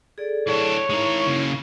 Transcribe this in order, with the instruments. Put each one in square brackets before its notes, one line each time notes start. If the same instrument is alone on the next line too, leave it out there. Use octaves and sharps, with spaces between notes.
[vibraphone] G#4 A4 D5
[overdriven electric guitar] E3 D4 [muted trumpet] C#5
[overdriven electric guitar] G#3 A#4 [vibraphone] D#4 E4
[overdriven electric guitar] C#3 A#3